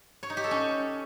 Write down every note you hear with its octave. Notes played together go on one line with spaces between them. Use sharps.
C#5
D#4
G4
A4
C#4